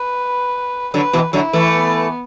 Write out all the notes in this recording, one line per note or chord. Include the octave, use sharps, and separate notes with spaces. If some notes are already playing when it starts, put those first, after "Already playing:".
Already playing: B4
D3 F#3 B4
B2 E3
D3 F#3 E4
E3 A3
B3